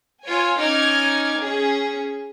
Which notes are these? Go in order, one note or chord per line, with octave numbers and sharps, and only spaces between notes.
F4 C#5 G#5
C#4 D#4 D6 F6 G#6
C#4 G#4